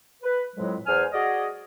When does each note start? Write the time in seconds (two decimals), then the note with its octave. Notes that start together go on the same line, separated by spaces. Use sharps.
0.23 B4
0.56 F2 A2 F#3 G#3
0.87 E2 C5 G#5 F6
1.12 F#4 G#4 D5 D#5